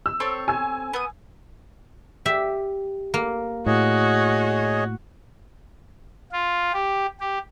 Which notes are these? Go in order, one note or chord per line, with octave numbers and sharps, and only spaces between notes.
E6
C4 A4 C#5
G#5 E6 G#6
B3 D#6
G4 E5
A#3
A2 F#4 G#4 C#5 D#5
F4
G4
G4